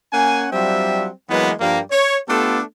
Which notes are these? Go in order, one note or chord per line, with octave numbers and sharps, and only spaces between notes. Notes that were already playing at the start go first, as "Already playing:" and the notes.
A#3 C#4 F#5 G#5
F#3 G3 C4 D4 F4 E5
E3 F#3 G#3 A#3 B3
G2 F3 G3 A#3
C#5
A3 B3 D4 F4 G4 A4